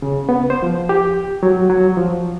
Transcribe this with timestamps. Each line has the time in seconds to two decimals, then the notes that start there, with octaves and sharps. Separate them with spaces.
0.02 C#3
0.29 B3
0.50 C5
0.63 F3
0.89 G4
1.43 F#3
1.70 F#3
1.97 F3